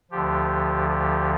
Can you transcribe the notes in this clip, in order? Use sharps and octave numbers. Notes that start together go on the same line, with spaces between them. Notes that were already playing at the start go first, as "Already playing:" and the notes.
D2 D3 F3 G4
G4